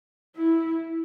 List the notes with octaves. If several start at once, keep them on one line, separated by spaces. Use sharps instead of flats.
E4